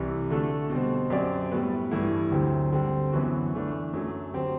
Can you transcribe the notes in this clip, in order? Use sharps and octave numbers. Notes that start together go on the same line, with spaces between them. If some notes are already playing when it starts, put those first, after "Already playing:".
Already playing: C2 C3 E3
D3 A3 D4 F#4 A4
B2 G3 C4
F#2 F#3 C4 G4 D5
A2 G3 B3 F#4 B4
G2 E3 A3 E4
D2 D3 F#3 C4 G4
D3 G3 C4 G4
F#2 E3 B3 F#4
E3 A3 D4
F#2 F#3 A3
D3 F#3 C4 G4